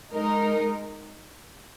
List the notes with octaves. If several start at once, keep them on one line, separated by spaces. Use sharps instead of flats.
G#3 D#4 A#4